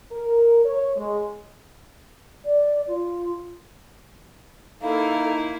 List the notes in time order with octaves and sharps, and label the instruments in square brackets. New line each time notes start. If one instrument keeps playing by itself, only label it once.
[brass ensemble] A#4
C#5
G#3
[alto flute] D5
F4
[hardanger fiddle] A#3 E4 [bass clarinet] D#4 [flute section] A4 [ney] F5